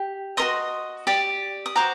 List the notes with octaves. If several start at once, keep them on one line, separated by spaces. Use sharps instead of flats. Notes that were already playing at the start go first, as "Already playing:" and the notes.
Already playing: G4
F#4 A#4 D#5 C6 D#6
G4 D5
D#6
F#4 C5 A#5 D6